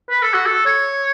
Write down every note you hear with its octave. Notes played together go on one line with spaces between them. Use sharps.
B4
A4
F#4
A4
C#5